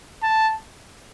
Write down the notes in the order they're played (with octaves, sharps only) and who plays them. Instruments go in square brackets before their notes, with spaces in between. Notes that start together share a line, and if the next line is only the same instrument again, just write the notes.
[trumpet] A5